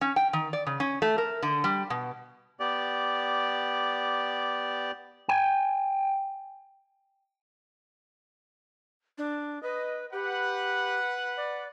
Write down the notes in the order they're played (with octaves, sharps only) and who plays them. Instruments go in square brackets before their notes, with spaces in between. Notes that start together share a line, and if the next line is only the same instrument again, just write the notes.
[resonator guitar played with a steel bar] C#4
G5
D#3
D5
C#3
C#4
A3
A#4
D3
G3
B2
[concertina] B3 G4 D5
[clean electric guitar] G5 G#5
[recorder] D4
[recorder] B4 [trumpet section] D#5
[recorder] G4 [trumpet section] B4 F#5
[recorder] D5